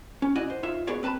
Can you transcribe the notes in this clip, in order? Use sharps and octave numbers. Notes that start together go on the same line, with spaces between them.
C#4
E4 F#4 D5 D#5
C5
D#4 F4 C#5 E5
B3 F#4 G#4 B4 C#5 D5
C4 B4 A5 B5